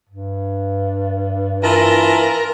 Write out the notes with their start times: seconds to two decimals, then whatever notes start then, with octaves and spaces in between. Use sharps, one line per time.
0.09 G2
1.63 E3 F4 A#4 A5